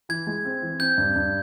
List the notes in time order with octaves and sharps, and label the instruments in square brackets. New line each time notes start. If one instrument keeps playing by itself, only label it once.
[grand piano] E3 [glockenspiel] G#6
[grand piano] G#3
C4
E3
[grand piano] C4 [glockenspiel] G6
[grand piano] G2
G2